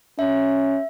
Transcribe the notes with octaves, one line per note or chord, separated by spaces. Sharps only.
C#4 E5